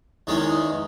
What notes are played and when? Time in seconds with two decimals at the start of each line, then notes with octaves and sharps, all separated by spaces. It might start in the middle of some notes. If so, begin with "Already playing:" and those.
0.27 E2 D#3 G#3 C#4